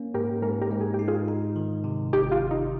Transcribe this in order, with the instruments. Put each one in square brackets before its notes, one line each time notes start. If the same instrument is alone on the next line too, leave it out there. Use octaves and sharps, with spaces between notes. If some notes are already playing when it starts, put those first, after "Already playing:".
Already playing: [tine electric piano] A#3 C#4
[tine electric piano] G#2 [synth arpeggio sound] G4 A#4
[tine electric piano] G#2 [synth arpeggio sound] G4 A#4
[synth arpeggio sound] G4 A#4
[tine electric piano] G#2
[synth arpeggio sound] G#4
G4
[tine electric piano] D#4
[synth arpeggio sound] F4 G#4
[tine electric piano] D#4
D#3
C3
[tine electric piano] G1 [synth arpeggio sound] D#4 G4
[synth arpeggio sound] F4
[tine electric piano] G1
[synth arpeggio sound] D#4